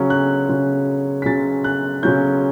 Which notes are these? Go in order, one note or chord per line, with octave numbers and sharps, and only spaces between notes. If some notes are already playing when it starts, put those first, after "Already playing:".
Already playing: C#3 F#3 C#4
F#6
C#3 F#3 C#4
B6
C#3 F#3 C#4 A6
F#6
C#3 F#3 C#4 G6